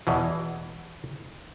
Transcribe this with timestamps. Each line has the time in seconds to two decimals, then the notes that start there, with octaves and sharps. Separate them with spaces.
0.07 E2 B2 E3